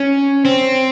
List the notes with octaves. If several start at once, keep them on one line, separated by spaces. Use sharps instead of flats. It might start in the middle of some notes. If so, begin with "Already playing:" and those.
Already playing: C#4
C4